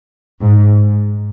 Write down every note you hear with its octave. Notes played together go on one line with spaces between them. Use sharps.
G#2